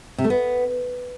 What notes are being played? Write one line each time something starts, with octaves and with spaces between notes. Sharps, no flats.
C3
A3
B3